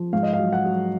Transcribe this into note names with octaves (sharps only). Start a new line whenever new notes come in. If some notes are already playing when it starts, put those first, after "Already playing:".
Already playing: F3
G#2 F5
D#5
F5
F#3
F#5
F#3